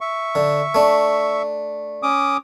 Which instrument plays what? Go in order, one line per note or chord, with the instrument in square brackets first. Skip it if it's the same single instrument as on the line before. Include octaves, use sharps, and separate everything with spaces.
[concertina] E5 C#6
[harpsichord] D3
A3 D4
[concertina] C#4 D6 D#6